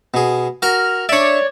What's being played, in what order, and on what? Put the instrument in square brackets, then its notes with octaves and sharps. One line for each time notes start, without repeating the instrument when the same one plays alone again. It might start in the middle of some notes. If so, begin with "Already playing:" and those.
[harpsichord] B2 G#4
[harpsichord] F#4 A#4 [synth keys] F6
[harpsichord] D4 E5 [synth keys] C#5 D5